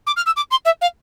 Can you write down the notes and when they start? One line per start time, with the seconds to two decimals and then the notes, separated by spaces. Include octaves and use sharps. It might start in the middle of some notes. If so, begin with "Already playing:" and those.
0.07 D6
0.17 F6
0.26 E6
0.36 D6
0.51 C6
0.65 E5
0.81 F5